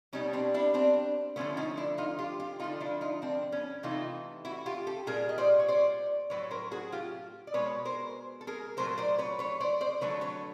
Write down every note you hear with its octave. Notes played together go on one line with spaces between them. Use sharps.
B2 G3 C#4 D#4
C4 D4
D4 E4
C4 D4
D3 F3 A3 B3 C#4
C#4 D#4
D4 E4
D#4 F4
F4 G4
F4 G4
D3 F3 A3 D#4 F4
D4 E4
D#4 F4
C4 D4
B3 C#4
C3 E3 A3 D#4 F4
E4 F#4
F4 G4
G4 A4
A#2 G3 G#4 A#4
D#5
C5 D5
C#5
C5 D5
A2 F#3 A3 B4 C#5
A#4 C5
F#4 G#4
F4 G4
D5
B2 G#3 B4 C#5
A#4 C5
A4
G#4 A#4
A#2 F#3 A3 A#4 C5
C5 D5
B4 C#5
B4 C#5
C5 D5
C5 D5
D3 F#3 A3 B4 C#5
B4 C#5